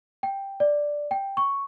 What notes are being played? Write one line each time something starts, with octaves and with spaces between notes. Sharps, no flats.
G5
D5
G5
C#6